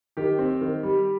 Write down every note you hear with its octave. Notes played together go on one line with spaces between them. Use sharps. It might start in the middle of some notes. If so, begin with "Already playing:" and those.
D#3 G4
C4
D#3
G3